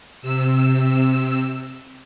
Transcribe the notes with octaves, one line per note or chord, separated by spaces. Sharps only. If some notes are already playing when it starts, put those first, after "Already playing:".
C3 E6